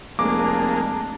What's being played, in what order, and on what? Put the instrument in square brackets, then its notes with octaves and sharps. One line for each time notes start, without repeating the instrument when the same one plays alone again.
[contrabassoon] F1 [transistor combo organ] G#3 A#3 [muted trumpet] D4 [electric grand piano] D6